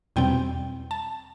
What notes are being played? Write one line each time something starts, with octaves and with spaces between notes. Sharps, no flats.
E2 B2 G3 C4 G5
A5